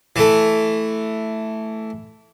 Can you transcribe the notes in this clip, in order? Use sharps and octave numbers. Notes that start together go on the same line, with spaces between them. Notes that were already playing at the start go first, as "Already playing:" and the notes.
E3 A3